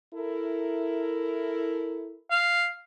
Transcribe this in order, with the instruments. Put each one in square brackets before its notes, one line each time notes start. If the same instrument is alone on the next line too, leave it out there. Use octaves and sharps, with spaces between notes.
[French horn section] E4 A4 A#4
[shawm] F5